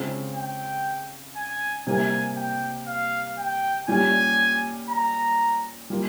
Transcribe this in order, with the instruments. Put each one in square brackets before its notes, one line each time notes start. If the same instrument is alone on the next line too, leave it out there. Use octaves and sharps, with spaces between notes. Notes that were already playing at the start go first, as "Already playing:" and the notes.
Already playing: [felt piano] C#3 G#3 C4 F4
[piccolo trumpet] G5
G#5
[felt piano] C3 G3 A#3 [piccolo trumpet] G#5
[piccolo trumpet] G5
F5
G5
[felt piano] A#2 G3 C#4 G4 [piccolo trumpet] G#5
[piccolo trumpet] A#5
[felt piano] G3 A#3 F4